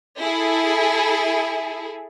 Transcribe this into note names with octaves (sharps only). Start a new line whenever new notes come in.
E4 G#4 A4